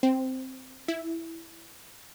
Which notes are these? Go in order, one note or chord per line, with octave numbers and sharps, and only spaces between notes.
C4
E4